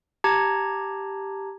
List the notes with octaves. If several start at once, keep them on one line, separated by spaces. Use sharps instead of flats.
G4 A5 A#5 G#6